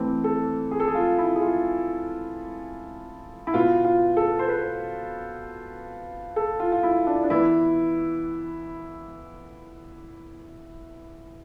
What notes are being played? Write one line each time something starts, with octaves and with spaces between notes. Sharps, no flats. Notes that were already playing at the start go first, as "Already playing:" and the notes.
Already playing: E3 A3 C4
A4
G#4
A4
G#4
F4
E4
G#4
F4
E4
B2 B3 F4
F4
A4
C5
B4
A4
F4
F4
E4
D4
D4
E3 B3 E4